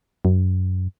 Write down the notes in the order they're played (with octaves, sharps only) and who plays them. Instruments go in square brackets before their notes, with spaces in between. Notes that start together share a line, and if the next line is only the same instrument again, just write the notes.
[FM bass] F#2